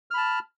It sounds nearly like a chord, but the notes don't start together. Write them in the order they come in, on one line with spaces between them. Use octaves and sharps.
F6 B5 A5